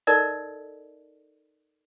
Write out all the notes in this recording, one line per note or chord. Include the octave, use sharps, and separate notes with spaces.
D#4 A4 A#4 D5 D#5